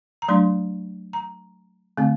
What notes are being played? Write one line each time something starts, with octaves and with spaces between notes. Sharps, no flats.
A#5
F#3 A3 D4 C6
A#5
D3 A3 C4